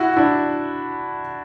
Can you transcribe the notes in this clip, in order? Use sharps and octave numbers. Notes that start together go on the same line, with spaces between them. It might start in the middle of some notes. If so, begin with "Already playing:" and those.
Already playing: E4 F#4
D4 E4